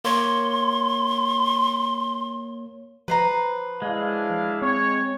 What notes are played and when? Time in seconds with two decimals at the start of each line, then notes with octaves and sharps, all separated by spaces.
0.05 A#3 C#5 C6
3.08 F3 B4 C5 A#5
3.82 G#3 D4 E4 F5
4.62 C4 C#5